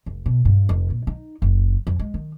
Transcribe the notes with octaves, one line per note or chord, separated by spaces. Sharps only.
F1
B2
G2
F1
A#2
D#4
F#1
F2
G#3
D#3